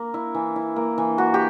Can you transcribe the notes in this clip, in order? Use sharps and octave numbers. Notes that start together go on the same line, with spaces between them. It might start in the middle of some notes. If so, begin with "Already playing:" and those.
Already playing: A#3
E4
E3
E4
A#3
E3
A#3 F#4
G4